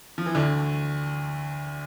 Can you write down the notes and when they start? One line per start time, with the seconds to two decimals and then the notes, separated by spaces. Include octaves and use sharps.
0.18 F3
0.26 E3
0.35 D2 D3